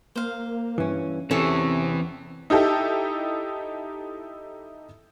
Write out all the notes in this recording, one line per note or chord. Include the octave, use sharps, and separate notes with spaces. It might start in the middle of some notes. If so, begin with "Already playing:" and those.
A#3 C5 F5
G2 E3 C#4
E2 C3 E3 C4 C#4 A4 E5 C#6
D#4 E4 G4 A4 E5